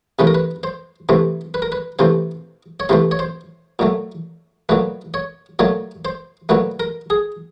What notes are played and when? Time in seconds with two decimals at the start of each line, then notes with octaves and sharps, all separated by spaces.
0.19 C3 E3 A3 B4
0.27 A#4
0.35 B4
0.63 C5
1.09 C3 E3 A3 C5
1.54 B4
1.62 A#4
1.72 B4
1.99 C3 E3 A3 C5
2.80 C#5
2.89 C3 E3 A3 C5
3.11 C#5
3.19 C5
3.79 A#2 F#3 A3
4.69 A#2 F#3 A3 B4
5.14 C#5
5.59 A#2 F#3 A3 C#5
6.05 C5
6.49 A#2 F#3 A3 B4
6.80 A#4
7.10 G#4